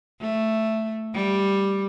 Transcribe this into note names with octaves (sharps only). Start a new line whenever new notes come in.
A3
G3